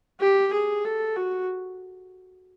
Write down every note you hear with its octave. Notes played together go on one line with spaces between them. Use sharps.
G4
G#4
A4
F#4